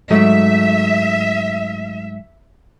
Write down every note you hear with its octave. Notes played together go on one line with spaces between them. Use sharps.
G#2 F#3 A3 E5